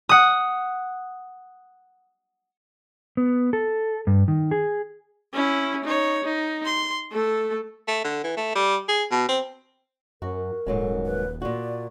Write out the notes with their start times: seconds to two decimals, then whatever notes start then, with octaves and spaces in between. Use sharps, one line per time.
0.09 F#5 D#6
3.17 B3
3.53 A4
4.07 G2
4.28 D#3
4.51 G#4
5.33 C#4 E4
5.84 D#4 C#5
6.24 D#4
6.65 C6
7.12 A3 A4
7.88 A3
8.04 D3
8.24 E3
8.37 A3
8.55 G3
8.89 G#4
9.11 B2
9.29 C4
10.22 F#2 F#4 A#4
10.66 D#1 G#2 F#3 G#3 A4
11.06 B4
11.42 A#2 F#4 D5